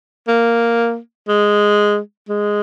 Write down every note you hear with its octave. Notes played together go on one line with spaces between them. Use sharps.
A#3
G#3
G#3